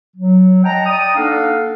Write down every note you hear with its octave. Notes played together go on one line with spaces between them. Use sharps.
F#3
D#5 F#5 G5 A5 A#5
D5 G5 A#5 D#6
A#3 D4 D#4 A4 F5 F#5